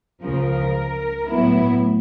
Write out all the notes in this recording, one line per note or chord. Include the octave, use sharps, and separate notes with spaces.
C#2 C#3 F3 A#4
A2 F#3 B3 E4